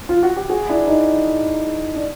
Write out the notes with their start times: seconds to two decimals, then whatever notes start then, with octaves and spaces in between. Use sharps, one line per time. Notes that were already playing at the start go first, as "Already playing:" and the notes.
0.09 F4
0.23 F#4
0.36 G4
0.49 F#4 G#4
0.69 D4 E4
0.87 D#4
1.95 D4